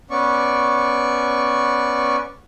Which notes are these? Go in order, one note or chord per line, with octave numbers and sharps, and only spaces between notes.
B3 C#4 D5 C#6